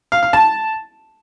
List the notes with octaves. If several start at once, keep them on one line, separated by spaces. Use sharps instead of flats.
F5
F5
A5